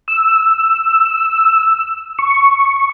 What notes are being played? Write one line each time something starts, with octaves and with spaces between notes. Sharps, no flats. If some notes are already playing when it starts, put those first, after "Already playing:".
E6
C#6